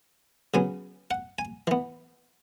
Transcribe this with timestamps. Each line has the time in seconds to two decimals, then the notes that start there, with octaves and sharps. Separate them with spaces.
0.54 C#3 F#3 B3 G#5
1.11 F#5
1.39 G#5
1.67 E3 B3